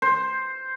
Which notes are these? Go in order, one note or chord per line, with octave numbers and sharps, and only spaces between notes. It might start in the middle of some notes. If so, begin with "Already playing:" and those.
C5